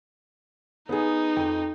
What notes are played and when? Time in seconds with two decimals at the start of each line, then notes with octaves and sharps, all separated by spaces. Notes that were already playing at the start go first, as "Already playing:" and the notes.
0.89 B3 D#4 G#4
1.36 F2 G5